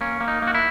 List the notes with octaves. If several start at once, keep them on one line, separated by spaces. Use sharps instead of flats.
A#3 C#4
A#3
D#4
A#3
F#4
E4